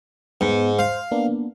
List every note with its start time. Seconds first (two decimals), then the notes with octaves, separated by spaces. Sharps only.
0.41 G#2 B3
0.79 C5 F5
1.12 A#3 B3 D4